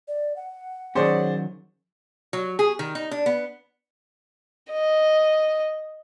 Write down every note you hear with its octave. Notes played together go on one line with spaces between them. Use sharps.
D5
F#5
D#3 F#3 C#4 G#4 C5 D5
F#3
G#4
D#3
D#4
D4
B3
D#5